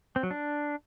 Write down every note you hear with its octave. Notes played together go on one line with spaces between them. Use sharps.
C4
F#3
D4